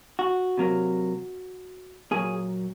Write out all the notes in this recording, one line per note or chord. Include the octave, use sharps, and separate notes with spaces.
F#4
C3 F#3 A#3
A#2 F#3 A#3 G#4